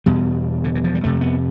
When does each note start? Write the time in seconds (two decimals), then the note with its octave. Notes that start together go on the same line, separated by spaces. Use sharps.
0.06 E2 B2 G3
0.64 D3
0.75 E3
0.84 F3
0.95 G3
1.04 F2 C3 A3
1.21 B3